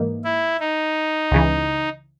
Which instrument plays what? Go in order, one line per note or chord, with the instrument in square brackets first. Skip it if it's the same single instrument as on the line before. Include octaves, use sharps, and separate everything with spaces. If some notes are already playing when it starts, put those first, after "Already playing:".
Already playing: [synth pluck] G#2 E3 A#3 D#4
[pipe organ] E4
D#4
[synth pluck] C#2 C#3 E3